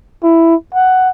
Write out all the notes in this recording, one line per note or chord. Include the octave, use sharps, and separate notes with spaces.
E4
F#5